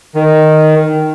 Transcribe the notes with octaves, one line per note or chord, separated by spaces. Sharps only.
D#3